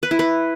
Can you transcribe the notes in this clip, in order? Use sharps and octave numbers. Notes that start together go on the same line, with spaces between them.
B4
E4
B4